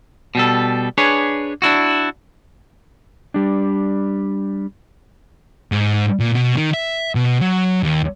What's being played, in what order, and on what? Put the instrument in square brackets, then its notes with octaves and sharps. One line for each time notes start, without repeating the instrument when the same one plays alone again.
[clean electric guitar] B2 G3 A4
D4 G#4 B4 C#5
D4 E4 F#4
G3 D4
[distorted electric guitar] G#2
A#2
B2
D#3
E5
B2
F#3
D#2